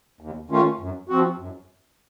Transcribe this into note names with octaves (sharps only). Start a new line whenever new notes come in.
D#2
D#3 A3 C#4 F4
F#2
F3 C4 F#4
F#2